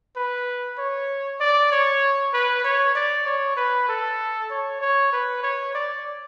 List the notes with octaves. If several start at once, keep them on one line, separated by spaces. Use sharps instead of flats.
B4
C#5
D5
C#5
B4
C#5
D5
C#5
B4
A4
C#5
C#5
B4
C#5
D5